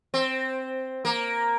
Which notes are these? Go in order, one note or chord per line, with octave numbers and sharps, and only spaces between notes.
C4
A#3